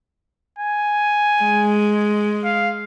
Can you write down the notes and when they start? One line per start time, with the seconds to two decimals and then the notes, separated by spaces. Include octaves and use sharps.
0.59 G#5
1.43 G#3
2.44 F5